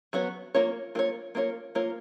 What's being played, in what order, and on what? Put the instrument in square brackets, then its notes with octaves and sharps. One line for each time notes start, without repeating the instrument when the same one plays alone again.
[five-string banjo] F#3 B3 F#4 C#5
A#3 F4 A#4 C#5
A#3 F4 A#4 C#5
A#3 F4 A#4 C#5
A#3 F4 A#4 C#5